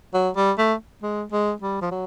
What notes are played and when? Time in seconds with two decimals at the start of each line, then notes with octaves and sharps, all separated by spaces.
0.14 F#3
0.36 G3
0.58 A3
1.03 G#3
1.32 G#3
1.62 G3
1.82 F3
1.91 F#3